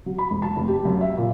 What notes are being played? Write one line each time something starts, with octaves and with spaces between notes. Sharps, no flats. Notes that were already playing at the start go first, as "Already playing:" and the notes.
F#3
B5
E1
A5
F1
G4
F#2
E5
A#2